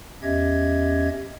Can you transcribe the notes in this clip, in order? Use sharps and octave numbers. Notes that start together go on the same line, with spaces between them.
E2 C#4 G4 D#5 E5 G#6